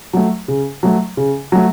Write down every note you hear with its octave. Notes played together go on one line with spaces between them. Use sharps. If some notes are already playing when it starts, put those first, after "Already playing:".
F#3 A3
C#3
F#3 A3
C#3
F#3 A3